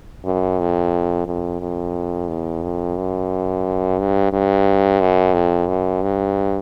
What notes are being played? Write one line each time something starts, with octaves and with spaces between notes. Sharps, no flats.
F#2
F2
F2
F2
E2
F2
F#2
G2
G2
F#2
F2
F#2
G2